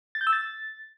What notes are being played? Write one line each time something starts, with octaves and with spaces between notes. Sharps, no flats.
A6
G6
E6
A6